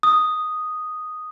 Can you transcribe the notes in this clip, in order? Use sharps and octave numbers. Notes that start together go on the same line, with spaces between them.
D#6